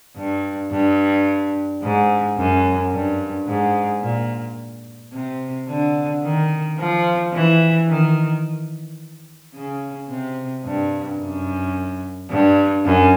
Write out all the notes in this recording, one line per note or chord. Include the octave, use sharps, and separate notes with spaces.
G2
G2
G#2
F#2
G2
G#2
A#2
C3
D3
D#3
F3
E3
D#3
C#3
C3
G2
F#2
G2
F#2